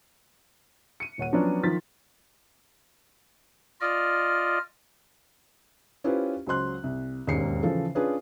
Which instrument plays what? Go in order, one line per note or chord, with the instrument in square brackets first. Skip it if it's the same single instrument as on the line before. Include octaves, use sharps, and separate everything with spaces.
[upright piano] C#7 D#7
D#1 C#5 F#5 D#7
F3 F#3 B3 C#4 D4 D5
D#3 F3 F4 A6 B6
[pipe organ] F4 D5 D#5 [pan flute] F6
[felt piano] C#4 E4 F4 G4 B4 C5
C#2 F#3 C5 C6 F#6
C2
E1 D#2 G#2 C#4 C7 C#7
C#3 E3 F3 A4
C#4 D4 F4 G#4 B4